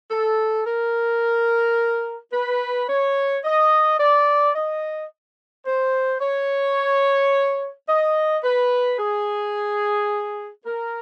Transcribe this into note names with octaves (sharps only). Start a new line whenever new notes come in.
A4
A#4
B4
C#5
D#5
D5
D#5
C5
C#5
D#5
B4
G#4
A#4